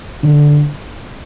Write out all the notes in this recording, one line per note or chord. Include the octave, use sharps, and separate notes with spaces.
D3